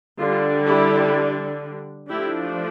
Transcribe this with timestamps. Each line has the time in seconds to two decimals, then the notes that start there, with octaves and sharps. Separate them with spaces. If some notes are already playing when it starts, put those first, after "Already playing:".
0.18 D3 G3 D4 F4
0.66 E4 G4
2.09 F3 A3 D4 E4 G4